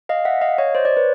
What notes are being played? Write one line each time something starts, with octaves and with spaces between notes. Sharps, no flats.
D#5 F5
E5 F#5
D#5 F5
C#5 D#5
C5 D5
C5 D5
B4 C#5